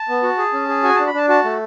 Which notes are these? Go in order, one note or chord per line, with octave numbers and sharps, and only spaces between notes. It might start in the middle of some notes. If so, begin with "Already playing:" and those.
Already playing: A5
B3
F#4
G#4
C#4
G#4
F#4 G#5
D4 A5
B5
D4 A5
F#4 A5
A3